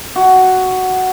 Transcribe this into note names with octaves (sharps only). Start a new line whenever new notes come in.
F#4